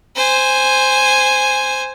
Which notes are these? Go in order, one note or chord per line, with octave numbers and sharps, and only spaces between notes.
C5 G#5